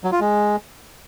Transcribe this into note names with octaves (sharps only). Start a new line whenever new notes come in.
F#3
F4
G#3